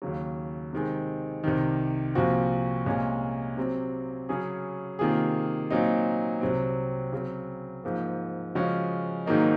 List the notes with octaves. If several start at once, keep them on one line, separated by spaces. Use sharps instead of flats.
D#2 C#3 F#3
C3 D#3 G#3 C4
C2 C3 D#3
C2 A#2 F3 C4 F#4
C2 A#2 G#3 C#4
C3 F#3 C4
C#3 F#3 C#4 G#4
C3 D#3 A#3 F4 G#4
A#2 F#3 C4 D#4
C2 C3 F#3 C4
C#3 F#3 C4
G#2 F3 A#3
C#3 F3 G#3 C#4 F#4
G#2 D#3 F#3 A#3 D#4